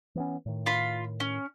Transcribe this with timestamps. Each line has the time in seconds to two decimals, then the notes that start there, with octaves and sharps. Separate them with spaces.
0.15 E3 B3 C#4
0.46 A2 D#3
0.66 F4 B5
1.20 C#4